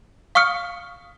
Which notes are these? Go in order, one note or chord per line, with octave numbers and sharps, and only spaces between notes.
F5 C#6 D#6 F6 C#7